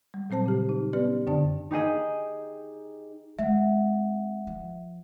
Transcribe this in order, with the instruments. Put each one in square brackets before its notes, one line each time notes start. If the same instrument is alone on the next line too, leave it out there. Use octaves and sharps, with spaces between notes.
[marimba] G3
A#2 F#3 C4 C5 A5
C#3 G4
D#4
B3 C#4 G4 B4 D5
F#2 D3 D4 D5 A5
[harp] D#4 G4 G#4 D#5
[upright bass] G#3 C4 [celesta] E5 F#5
[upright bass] F3